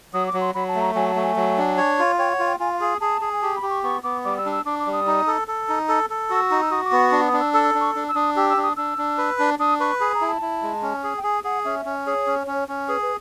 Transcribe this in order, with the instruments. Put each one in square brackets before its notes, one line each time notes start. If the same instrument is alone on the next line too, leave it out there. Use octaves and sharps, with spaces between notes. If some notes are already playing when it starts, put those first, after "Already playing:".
[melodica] F#3 [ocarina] D#6
[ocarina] D6
[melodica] F#3
[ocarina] C6
[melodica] F#3 [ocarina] B5
[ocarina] A5
[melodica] A3
[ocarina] A#5
[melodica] F#3 [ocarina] G#5
[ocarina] A5
[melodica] A3
[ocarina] G#5
[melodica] F#3
D4
C#5
F4
[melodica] C#5 [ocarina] G5
[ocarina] F#5
[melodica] F4
[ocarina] G5
[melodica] F4 [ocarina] G#5
[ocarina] F5
[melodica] G#4
[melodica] G#4 [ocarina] A5
[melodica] G#4
[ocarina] G#5
[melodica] G4 [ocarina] A5
[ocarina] B5
[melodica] G4
[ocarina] C#6
[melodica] B3 [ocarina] C#6
[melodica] B3 [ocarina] D6
[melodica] G3 [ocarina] D6
[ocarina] E6
[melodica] D4
[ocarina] E6
[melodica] D4 [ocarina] D6
[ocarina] D6
[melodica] G3
[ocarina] D#6
[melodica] D#4
A4
A4
D#4
A4
A4
[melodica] F#4 [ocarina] E6
[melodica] D#4
[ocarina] E6
[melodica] F#4 [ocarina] D#6
[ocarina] D6
[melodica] B3
[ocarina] C#6
[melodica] D4
[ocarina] D#6
[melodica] D4
[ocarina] E6
[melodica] A4 [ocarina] E6
[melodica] D4
[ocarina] C#6
[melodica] D4
[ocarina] E6
[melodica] D4 [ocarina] D#6
[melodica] G4 [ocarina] E6
[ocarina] E6
[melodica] D4
[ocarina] D#6
[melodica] D4 [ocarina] E6
[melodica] D4
B4
D4
[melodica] D4 [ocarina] D#6
[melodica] B4 [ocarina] C#6
[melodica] G#4 [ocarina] B5
[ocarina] A#5
[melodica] E4
[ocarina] A5
[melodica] E4
G#3
C#4
G#4
[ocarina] G5
[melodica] G#4 [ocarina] G#5
[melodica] G#4 [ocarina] F#5
[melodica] C#4 [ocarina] E5
[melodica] C#4
[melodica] G#4 [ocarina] C#5
[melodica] C#4
C#4
C#4
[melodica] G#4 [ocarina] B4
[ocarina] B4